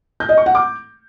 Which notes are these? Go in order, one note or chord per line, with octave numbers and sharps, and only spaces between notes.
G6
D#5
C#6
F#5
D6